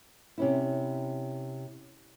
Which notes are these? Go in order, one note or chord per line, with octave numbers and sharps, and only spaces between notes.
C3 C#4 E4